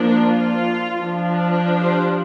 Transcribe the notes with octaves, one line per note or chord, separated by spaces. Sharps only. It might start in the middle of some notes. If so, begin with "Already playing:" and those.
Already playing: F3 A#3 D4
F4
F3 D4
G4 C5